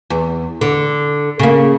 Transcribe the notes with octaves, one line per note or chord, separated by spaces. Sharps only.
E2
D3
C#3 A#3